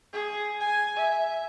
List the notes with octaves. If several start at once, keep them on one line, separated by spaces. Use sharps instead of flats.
G#4
G#5
E5